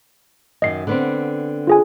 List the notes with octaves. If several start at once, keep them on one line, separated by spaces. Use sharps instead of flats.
F#2 D#3 D#5 C7
D3 B3 C4
F4 G#4 G#5